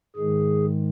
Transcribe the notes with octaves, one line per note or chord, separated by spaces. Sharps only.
G#2 D#3 G#3 G#4